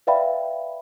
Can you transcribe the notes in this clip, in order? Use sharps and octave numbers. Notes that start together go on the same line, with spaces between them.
B4 D5 E5 F5 G5 B5